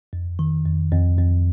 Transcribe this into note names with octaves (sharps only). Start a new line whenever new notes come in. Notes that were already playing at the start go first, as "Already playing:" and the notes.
F2
D#3
F2
F2
F2